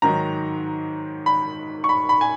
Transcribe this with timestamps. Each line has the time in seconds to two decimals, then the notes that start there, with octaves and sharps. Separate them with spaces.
0.02 G#2 D#3 F#3 A#5
1.26 B5
1.84 C#6
1.89 B5
2.09 B5
2.21 G#5